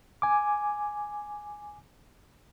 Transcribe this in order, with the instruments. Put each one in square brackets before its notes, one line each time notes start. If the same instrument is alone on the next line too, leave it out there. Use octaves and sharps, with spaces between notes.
[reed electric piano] G#5 D6